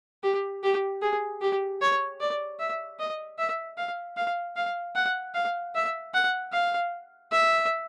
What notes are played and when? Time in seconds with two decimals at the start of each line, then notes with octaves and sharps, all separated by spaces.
0.23 G4
0.63 G4
1.02 G#4
1.42 G4
1.81 C#5
2.20 D5
2.59 E5
3.00 D#5
3.38 E5
3.78 F5
4.17 F5
4.56 F5
4.96 F#5
5.35 F5
5.75 E5
6.14 F#5
6.53 F5
7.31 E5